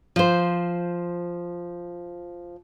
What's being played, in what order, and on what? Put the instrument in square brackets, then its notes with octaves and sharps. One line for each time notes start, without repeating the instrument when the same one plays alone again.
[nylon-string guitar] F3 C5